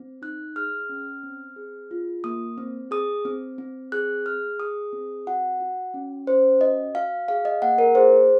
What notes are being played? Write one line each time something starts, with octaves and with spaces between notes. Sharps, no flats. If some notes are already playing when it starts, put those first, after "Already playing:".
Already playing: C4
D#4 F#6
G#4 F6
C#4
C4
G#4
F4
A#3 D#6
C4
G#4 D#6
C4
C4
G#4 F#6
G#4 F6
G#4 D#6
C4
F#4 F#5
F#4
C#4
C#4 C5
F#4 D#5
F#4 F5
G#4 F5
D#5
A#3 F#5
A#4
G#4 C5